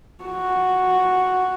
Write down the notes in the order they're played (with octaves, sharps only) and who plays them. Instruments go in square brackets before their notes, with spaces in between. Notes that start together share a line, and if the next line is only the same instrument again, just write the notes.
[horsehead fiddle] F#4